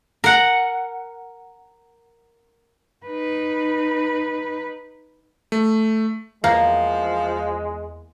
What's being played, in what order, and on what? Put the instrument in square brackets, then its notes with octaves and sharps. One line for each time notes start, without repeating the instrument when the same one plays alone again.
[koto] A#4 F#5
[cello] D#4 B4
[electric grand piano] A3
[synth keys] E2 [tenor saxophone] F3 [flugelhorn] G#3 [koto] A#3